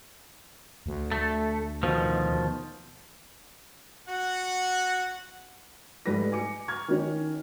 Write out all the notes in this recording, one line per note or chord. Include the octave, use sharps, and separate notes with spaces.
D2
A3
B2 D#3 F3
F#4 F#5
G#2 G3 A3 B4 A#6
G#5 D6 C#7
C#6 F6 G#6
D#3 C#4